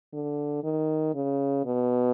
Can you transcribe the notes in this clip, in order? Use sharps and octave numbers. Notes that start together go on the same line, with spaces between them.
D3
D#3
C#3
B2